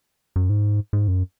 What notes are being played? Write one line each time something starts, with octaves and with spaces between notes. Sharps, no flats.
F#2
G#2
G#2
F#2